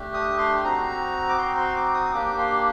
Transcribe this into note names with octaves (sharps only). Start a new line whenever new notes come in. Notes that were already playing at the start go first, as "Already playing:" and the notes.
Already playing: A3 D4 G4
D#6
C6
C6
C4 D#4 F#4 A#5
D6
C6
C6
D6
D#6
A#3 D4 G4 D6
C6